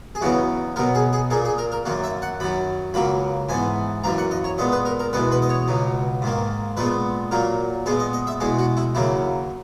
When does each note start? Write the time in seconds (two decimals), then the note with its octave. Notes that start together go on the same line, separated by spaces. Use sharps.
0.15 G#4
0.21 E2 C#3 F#3 B3 F#4
0.76 B2 F#3 B3 A#4
0.95 G#4
1.13 G#4
1.30 A#2 A#3 G#4
1.45 G#4
1.58 A#4
1.72 A#4
1.85 F#2 D#3 A#3 F#4
2.04 E5
2.22 F#5
2.40 F#2 D#3 F#3 B5
2.94 C#2 C#3 F#3 A#3 B5
3.49 G#2 E3 B3 G#5
4.04 F#2 E3 A#3 A#5
4.18 F#5
4.31 D#5
4.44 C#5
4.58 A#2 G#3 B3 D#5
4.72 B4
4.85 A#4
4.99 A#4
5.13 E2 B2 G#3 B3 B4
5.32 B4
5.42 D#5
5.49 C#5
5.68 C#2 B2 F#3
6.22 G#2 D#3 A#3
6.77 A#2 G#3 B3 B4
7.31 A#2 F#3 A#3 A#4
7.86 A#2 G#3 B3 G#4
8.00 D#5
8.13 D#5
8.27 E5
8.40 E2 B2 G#3 G#4
8.59 F#4
8.77 E4
8.95 D#2 C#3 F#3 A#3 E4